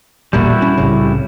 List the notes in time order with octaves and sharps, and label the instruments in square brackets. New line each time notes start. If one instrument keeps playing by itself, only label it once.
[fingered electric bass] E1 A1 A#2 [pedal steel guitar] G3 E4 F#4
[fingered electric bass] C#4
C2 A2 C#3